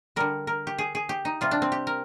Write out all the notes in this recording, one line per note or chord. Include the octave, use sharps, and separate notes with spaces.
D3 G3 A#4
A#4
G4
G#4
G#4
G4
D#4
C3 G3 F4
D4
C4
G4
A#4